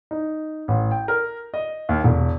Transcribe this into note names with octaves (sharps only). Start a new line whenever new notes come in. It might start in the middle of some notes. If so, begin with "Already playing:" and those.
D#4
A1
G5
A#4
D#5
D#2
E1